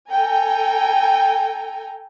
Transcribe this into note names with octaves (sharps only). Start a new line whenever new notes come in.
A4 G5 G#5 A#5